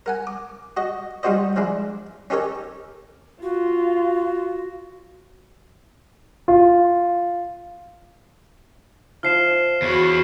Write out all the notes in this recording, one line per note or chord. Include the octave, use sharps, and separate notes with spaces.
A#4 F#5 G#5
D6
F#4 D#5
G3 D#4 F4 F#4 C5 D#5
F3 G#3 D4 E4
C#4 D#4 G4 A4 A#4 C#5
F4 F#4
F4
F3 F4 F6 C7 E7
E2 F#4 C#5 B5